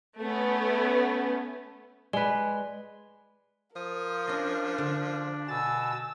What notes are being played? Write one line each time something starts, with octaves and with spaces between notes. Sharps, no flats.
A3 B3 C#4
G#3 B4 D5
F3 A#4 D#6
C#4 D4 D#5
D3
B2 G#5 A5 E6 A6